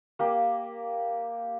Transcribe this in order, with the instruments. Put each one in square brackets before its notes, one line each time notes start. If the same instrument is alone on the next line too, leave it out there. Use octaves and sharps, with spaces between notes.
[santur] A#3 G4